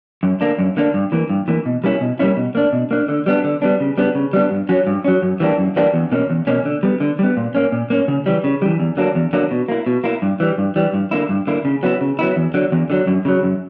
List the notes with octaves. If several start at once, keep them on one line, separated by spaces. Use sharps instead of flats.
F#2
D3 A#3 D4
F#2
D3 A#3 D4
G2
E3 A#3
G2
E3 A#3
B2
G3 A#3 C#4 E4
B2
G3 A#3 C#4 E4
B2
A#3 D4
B2
A#3 D4
D3
G3 B3 D4
D3
G3 B3 D4
C#3
G3 B3 D4
C#3
G3 B3 D4
G2
F#3 C#4
G2
F#3 C#4
F#2
E3 G3 A#3 D4
F#2
E3 G3 A#3 D4
E2
B2 A#3 C#4
E2
B2 A#3 C#4
D3
G3 B3
D3
G3 B3
A#2
A#3 C#4
A#2
A#3 C#4
C#3
E3 G3
C#3
E3 G3
E2
D3 F#3 A#3 D4
E2
D3 F#3 A#3 D4
B2
A#3 E4
B2
A#3 E4
G2
E3 G3
G2
E3 G3
G2
D3 A#3 E4
G2
D3 A#3 E4
C#3
F#3 B3 E4
C#3
F#3 B3 E4
E2
D3 F#3
E2
D3 F#3
F#2
C#3 F#3
F#2